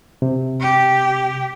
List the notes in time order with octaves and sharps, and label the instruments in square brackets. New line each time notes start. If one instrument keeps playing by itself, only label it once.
[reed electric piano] C3
[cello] G4